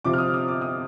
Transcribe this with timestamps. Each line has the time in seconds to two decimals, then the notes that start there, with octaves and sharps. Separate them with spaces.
0.05 C3 F3 C4 D6
0.13 F6
0.18 D#6
0.34 D#6
0.48 D6
0.61 D#6